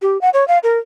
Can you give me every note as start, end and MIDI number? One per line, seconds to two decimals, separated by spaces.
0.02 0.20 67
0.21 0.30 78
0.34 0.47 73
0.48 0.58 77
0.63 0.78 70